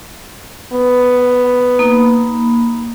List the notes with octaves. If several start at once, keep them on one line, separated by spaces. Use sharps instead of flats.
B3
A#3 D#4 B5